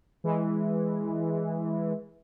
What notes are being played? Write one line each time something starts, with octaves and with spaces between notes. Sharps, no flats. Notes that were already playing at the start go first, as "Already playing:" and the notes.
E3 G#3